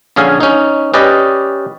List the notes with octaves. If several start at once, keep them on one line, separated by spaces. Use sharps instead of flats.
A#1 D3 C#4 G#4 F5 G#5
C#4 D#4
C#4 G4 B4 D5 D#5